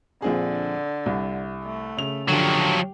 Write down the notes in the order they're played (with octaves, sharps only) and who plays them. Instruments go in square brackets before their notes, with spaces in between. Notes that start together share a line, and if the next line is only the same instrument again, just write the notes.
[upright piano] A#1 C4 G#4 [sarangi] D3
[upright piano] C2
[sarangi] A3
[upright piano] C#3 F7
[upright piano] F#2 D3 [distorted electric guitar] F3 F#3 [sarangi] G4